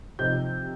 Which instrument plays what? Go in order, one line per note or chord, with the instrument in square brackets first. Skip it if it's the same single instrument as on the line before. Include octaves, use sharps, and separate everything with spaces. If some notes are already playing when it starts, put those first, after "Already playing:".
[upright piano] C3 F3 C4 D#4 G6